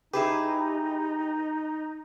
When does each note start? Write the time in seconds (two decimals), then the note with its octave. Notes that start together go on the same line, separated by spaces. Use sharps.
0.13 D#4 E4 G4 G#4 B4